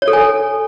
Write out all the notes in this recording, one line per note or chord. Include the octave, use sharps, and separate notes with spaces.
C#5
A4
G#5